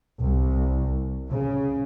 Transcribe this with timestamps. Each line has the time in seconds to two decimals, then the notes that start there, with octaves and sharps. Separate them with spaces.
0.21 C2
1.31 C#3